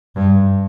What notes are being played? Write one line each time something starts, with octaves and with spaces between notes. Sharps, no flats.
G2